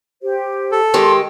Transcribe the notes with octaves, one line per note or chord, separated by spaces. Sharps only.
G4 C5
A4
D#3 G#3 G4 C6